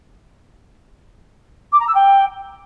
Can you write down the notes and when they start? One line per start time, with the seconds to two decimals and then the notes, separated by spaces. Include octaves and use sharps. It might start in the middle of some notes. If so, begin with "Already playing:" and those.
1.72 D6
1.79 A#5
1.87 E6
1.94 G5